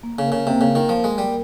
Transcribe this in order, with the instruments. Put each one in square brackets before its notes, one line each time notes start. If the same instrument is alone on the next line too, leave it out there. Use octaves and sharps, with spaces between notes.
[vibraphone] A#3
[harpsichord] C#3
[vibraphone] A#4
[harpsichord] C#3
[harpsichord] C3 [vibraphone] A#3
[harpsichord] C#3
[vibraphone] A#3
[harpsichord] D#3
[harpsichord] F3 [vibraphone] A#4
[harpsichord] G#3
[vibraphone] A#3
[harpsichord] G3